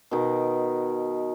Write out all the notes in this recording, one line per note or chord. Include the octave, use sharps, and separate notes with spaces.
B2 D#3